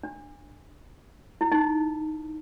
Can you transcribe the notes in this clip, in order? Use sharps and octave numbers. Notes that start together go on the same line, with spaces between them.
D4
E4
D#4